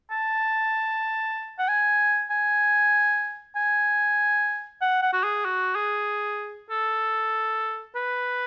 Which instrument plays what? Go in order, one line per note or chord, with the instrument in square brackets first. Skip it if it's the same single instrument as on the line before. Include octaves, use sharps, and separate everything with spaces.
[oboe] A5
F#5
G#5
G#5
G#5
F#5
F#5
F#4
G#4
F#4
G#4
A4
B4